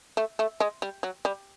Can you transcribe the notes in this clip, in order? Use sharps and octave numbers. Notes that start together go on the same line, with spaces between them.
A3
A3
G#3
G3
F#3
G3